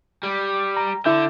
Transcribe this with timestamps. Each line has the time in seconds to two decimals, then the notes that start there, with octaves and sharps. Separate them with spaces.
0.23 G3
0.77 A#5
1.05 D3 E4 E5 G6